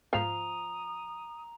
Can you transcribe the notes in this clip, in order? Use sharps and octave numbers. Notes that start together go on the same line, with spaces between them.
G#2 F3 F5 A#5 D#6 C7 F7